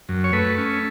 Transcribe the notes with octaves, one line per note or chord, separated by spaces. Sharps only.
F#2
C#5
A3 B4
C#4